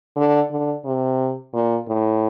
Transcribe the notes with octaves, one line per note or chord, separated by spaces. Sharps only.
D3
D3
C3
A#2
A2